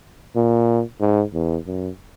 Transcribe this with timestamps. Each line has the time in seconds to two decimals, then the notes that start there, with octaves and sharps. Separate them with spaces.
0.36 A#2
1.00 G#2
1.34 E2
1.66 F#2